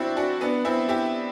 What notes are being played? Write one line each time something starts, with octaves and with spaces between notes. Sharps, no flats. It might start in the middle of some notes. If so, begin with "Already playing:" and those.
Already playing: C4 D4 E4 F#4 G4
D4 F#4
B3 D4
C4 E4
E4 G4